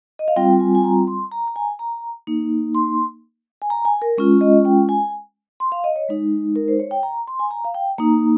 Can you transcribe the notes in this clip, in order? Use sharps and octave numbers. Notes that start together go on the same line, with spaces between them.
D#5
F5
G3 C4 F4 G5
G#5
G#5
A#5
C6
A#5
A#5
G#5
A#5
A#3 D#4
C6
G#5
A#5
G#5
A#4
G#3 C#4 F4
D#5
G5
G#5
C6
F5
D#5
C#5
G#3 D#4
A#4
C5
C#5
G5
A#5
C6
G#5
A#5
F5
G5
A#3 D#4 A#5